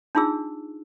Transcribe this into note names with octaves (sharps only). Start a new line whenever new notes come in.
D4 D#4 F4 G#4 E6